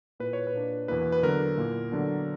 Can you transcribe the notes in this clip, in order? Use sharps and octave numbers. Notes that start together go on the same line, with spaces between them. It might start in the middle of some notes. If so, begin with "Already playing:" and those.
A#2 A#3 E4 B4
C#5
B4
A#2 A#3 D4
E2 B2 A#3 E4 B4
B4
D3 F#3 B3 A#4
A#2 A#3 E4
D3 F#3 B3 D4